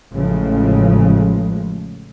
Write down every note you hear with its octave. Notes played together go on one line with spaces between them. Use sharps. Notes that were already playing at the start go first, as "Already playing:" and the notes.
A1 A2 C#3 F3 G#3